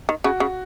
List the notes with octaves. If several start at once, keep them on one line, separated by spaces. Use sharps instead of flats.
D#3
C#3 F#4
C#3